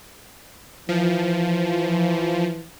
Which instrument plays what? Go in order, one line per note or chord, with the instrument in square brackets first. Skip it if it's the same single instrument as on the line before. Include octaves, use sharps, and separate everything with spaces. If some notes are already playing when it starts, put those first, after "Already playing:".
[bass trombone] E3 [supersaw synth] F3